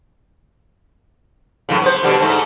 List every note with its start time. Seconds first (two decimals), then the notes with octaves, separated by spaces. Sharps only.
1.69 F#2 A2 C#3
1.82 B3 C5
2.03 B2 D3 G3
2.20 G#2 A3 C4